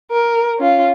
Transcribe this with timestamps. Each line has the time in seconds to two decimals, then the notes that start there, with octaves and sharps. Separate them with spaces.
0.12 A#4
0.58 C#4 F4